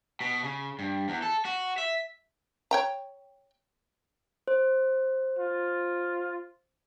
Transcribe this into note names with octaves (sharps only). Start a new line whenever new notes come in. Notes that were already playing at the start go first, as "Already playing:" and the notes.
B2
C#3
G2
E2
A4
F#4
E5
C#5 G5 A#5
C5
F4